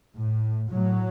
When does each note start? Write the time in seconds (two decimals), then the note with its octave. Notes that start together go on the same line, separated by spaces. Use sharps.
0.18 A2
0.71 A2 F#3